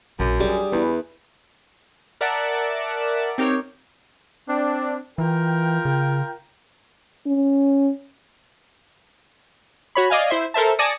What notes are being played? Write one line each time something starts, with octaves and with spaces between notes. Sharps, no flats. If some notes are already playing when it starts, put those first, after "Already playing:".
A#1 F#2
G3 D4 G#4
E2 E4 B4
A#4 D5 E5 F#5 A5
C4 D#4 G4 A#4 C#5
C4 D4
E3 F4 A#4 G5
C#3
C#4
F#4 C#5 B5
D5 D#5 F5 G#5
E4 C5 E5
A4 A#4 C5 E5 A5
D5 G#5 A5 D#6 A#6 C#7